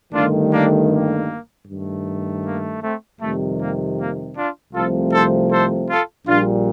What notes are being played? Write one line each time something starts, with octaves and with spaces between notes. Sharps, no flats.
G1 G2 D#3 A3 D4 F4
A#3 D4
A#3
G2 D#3 A3
A#3
A3 C4
F2 C3 D#3 G3 A3
A#3
A#3
D4 F4
C2 C3 F3 A3 F4 A4
A4 C5
A4 C5
F4 A4
A#1 A#2 G3 D4 F4